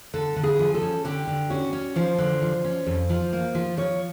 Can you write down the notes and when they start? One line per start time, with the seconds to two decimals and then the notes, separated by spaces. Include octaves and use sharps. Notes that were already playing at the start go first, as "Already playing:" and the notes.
0.14 D3 A4
0.36 D3
0.44 G#4
0.59 F3
0.74 A4
0.82 C#4
1.05 D3 G4
1.27 D3
1.50 C#4 F#4
1.73 C#4
1.96 F3 C5
2.18 D3
2.42 F3
2.64 C#4
2.86 F2
3.09 F3
3.33 A#3
3.55 F3
3.77 F3 C#5